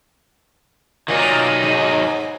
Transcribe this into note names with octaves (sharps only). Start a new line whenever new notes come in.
A#2 D#3 F#3 A#3 D#4
G#2